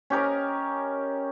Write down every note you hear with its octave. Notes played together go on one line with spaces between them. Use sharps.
C#4 G4 A#4 D#5